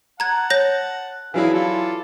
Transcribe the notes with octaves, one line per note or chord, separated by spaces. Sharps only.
F#5 A5 A#5 G#6
C#5 G6 A#6
E3 F#3 D4 E4 G#4 F5
F4 A4 D5